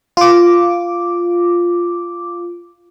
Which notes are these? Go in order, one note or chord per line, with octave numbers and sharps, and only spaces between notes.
F4 D6